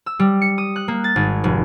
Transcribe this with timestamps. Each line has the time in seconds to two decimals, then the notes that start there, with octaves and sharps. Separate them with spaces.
0.06 E6
0.19 G3
0.42 C#7
0.58 D#6
0.76 F#6
0.88 A#3
1.04 A6
1.16 G#1
1.44 F1